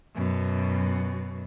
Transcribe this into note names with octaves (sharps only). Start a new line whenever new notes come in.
F#2 B2